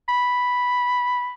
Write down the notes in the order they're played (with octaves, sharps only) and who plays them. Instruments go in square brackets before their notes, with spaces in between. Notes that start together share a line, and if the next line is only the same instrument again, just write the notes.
[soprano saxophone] B5